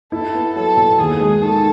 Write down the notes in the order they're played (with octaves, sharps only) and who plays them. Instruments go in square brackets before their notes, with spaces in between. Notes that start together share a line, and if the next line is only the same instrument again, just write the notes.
[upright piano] E4 [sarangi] A4
[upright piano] B3
[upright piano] F#3 [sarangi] A4
[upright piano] B2
[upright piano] D#2 [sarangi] G#4
[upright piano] G#3
[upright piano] D#3 [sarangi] A4